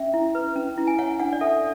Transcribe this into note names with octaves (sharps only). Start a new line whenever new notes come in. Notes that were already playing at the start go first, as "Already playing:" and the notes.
Already playing: C#4 E5
E4
B4
C#4
E4
G#5
C#5 F#5
D4 F#5
D5
A4 E5